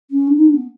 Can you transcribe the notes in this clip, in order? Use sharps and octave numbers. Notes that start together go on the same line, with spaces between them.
C#4
D4
D#4
D4
B3